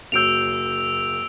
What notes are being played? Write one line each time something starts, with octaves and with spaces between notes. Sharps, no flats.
F#1 F#3 E6 G6 D7 F7